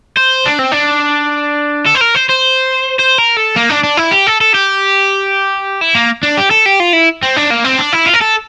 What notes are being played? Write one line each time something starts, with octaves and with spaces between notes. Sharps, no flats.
C5
D4
C4
D4
A4
C5
A#4
C5
C5
C5
A#4
A4
A#3
D4
D4
E4
G4
A4
A4
G4
E4
A#3
D4
G4
A4
G4
F4
E4
C4
D4
A#3
C4
D4
E4
F4
A#4
A4